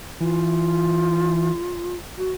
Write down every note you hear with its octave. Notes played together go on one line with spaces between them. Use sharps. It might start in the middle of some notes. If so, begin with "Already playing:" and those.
E3 F4
F#4